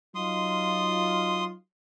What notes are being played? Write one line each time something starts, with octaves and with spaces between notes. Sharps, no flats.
F#3 D#4 F4 C6 D#6